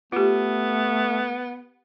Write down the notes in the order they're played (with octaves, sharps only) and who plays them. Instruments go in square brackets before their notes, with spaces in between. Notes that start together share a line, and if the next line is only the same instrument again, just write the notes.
[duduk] A3 [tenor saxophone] B3 [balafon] F4 G4